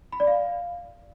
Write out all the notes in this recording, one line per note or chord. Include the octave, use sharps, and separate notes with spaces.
B5
D5
F5